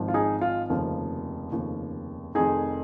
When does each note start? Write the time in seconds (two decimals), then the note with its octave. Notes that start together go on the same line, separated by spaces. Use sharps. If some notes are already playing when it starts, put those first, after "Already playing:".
Already playing: G#1 G#2 F3
0.08 F4
0.14 D#4 G#4
0.41 F4
0.69 F1 D#2 C#3 F3
1.52 F1 D#2 C#3 F3
2.35 F1 F2 D#3 D#4 G#4